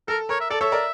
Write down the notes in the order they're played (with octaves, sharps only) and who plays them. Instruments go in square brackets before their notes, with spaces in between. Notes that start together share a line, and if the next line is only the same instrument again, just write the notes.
[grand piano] A4 [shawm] A#4
[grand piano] A#4 [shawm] C#5
[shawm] E5
[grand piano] A4 [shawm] D5
[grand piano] A4 C#5 [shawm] E5
[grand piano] A#4 D5